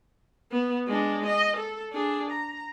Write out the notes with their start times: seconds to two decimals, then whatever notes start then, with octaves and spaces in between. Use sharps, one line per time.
0.51 B3
0.87 G#3 D4
1.26 D#5
1.57 A4
1.93 D4 G#4
2.31 A#5